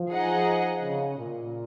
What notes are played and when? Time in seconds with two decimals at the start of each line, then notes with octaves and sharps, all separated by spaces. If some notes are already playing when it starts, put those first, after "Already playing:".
Already playing: F3
0.11 D#4 G#4 D#5 F#5
0.82 C#3
1.17 A#2